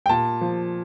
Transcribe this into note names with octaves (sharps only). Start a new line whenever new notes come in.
G5
A#2 A5
F3